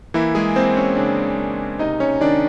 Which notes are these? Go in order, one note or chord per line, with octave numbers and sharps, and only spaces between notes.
E3 A#3 E4
G#3 G#4
A#3 C4 C5
C#4 C#5
C#3 D4 D5
A#3
C3 D#4 D#5
C#4 C#5
D#3 D4 D5